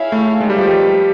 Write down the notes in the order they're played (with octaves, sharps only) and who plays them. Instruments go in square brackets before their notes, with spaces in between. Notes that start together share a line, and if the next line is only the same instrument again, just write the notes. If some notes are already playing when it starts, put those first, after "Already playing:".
Already playing: [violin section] E4 G#4 C#5 F5
[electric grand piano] A3
[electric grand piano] G#3 [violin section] A#3 D#4 G4 B4
[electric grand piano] G3
F3
G3